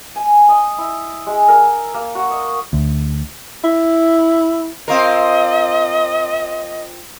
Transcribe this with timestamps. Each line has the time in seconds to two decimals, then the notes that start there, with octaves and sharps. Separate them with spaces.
0.16 G#5
0.48 D#5
0.78 E4
1.26 G#3
1.48 A#4
1.94 A#3
2.15 F#4
2.30 D#5
2.73 D2
3.64 E4
4.88 C4 F4 A#4 D#5